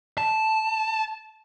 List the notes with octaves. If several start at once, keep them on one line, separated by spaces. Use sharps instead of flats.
A5